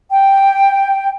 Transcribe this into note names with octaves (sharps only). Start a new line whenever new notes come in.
G5